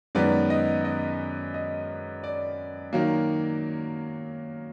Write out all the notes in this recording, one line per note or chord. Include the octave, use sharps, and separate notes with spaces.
F#2 D#3 G#3 B3 D5
D#5
D#5
D#5
D5
D#3 F#3 A#3